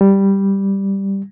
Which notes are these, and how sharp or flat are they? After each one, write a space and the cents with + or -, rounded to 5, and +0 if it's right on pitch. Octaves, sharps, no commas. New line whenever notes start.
G3 +0